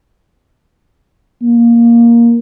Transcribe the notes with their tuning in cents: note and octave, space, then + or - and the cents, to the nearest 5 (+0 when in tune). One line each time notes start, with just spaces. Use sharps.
A#3 +10